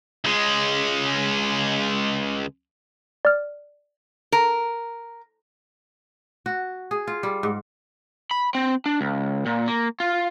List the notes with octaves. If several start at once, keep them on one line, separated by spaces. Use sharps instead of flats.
C#2 G#3
D5 F6
A#4
F#4
G#4
F4
G3
G#2
B5
C4
D4
C#2
A#2
A#3
F4